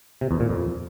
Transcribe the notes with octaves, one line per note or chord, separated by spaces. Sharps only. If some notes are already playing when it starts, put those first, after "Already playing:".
C3
E2
A#2
F2